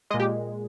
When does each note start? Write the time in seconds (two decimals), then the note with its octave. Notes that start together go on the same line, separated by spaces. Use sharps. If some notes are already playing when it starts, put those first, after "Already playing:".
0.10 G#3 D#5
0.14 A#2
0.20 G4